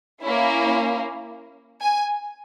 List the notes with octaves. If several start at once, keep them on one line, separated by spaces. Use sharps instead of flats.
A#3 C#4 E4
G#5